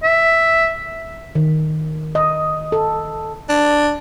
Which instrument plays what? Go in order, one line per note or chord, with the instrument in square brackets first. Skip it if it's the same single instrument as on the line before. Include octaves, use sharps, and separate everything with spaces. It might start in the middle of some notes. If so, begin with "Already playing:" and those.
[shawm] E5
[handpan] D#3
D#5
A4
[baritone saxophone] D4